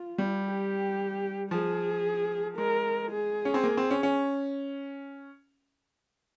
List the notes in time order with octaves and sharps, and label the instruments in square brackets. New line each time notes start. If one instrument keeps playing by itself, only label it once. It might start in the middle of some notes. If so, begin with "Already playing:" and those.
Already playing: [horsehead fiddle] F4
[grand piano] G3
[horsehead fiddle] G4
[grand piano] F3 [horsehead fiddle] G#4
[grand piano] G#3 [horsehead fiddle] A#4
[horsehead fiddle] G#4
[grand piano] C#4
C4
A#3
C4
C#4
C#4